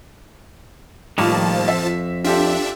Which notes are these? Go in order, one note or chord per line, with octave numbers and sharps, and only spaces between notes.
A2 D#3 F3 G3 A#3 A5
F2 E5
D4 F4 G4 A4 E5